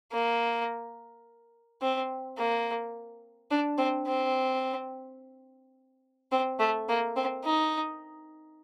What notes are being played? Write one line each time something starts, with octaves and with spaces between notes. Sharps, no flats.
A#3
C4
A#3
D4
C4
C4
C4
A3
A#3
C4
D#4